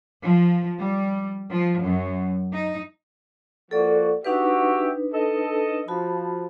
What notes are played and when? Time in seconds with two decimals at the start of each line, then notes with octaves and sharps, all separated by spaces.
0.23 F3
0.80 G3
1.50 F3
1.81 F#2
2.52 D#4
3.71 F3 A#3 F#4 A4 D5
4.25 D4 D#4 F#4 G4 B4 E5
5.13 A4 D#5
5.88 F3 F#4 A5 B5